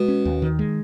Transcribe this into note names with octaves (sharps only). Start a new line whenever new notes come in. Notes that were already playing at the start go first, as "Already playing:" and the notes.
Already playing: B2 G#3
C#4
D#2
D#3
G#3